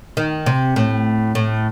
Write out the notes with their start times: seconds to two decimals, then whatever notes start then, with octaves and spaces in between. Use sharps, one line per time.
0.17 D#3
0.46 C3
0.76 A2
1.35 A2